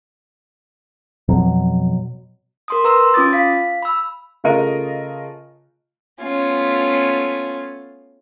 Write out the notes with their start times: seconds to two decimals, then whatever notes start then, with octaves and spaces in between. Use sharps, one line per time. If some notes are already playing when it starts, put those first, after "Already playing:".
1.29 F2 B2 F#3
2.68 A#4 C6 D#6
2.84 B4 A#5 C6 E6
3.14 C#4 F4 D6 D#6 A6
3.33 F5 B6
3.82 B5 E6
4.44 C#3 A3 F4 A#4 D#5 D#7
6.20 A3 B3 C#4 F4